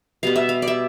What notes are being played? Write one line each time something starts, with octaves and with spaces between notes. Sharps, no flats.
B2 G3 B3 F5
E5
F5
D5
E5